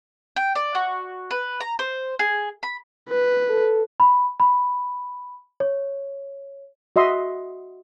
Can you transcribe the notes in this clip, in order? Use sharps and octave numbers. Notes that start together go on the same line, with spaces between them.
G5
D5
F#4
B4
A#5
C5
G#4
B5
B4
A4
B5
B5
C#5
F#4 D#5 E5 C6